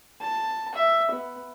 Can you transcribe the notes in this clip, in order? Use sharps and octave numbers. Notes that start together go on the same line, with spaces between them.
A5
E5
B3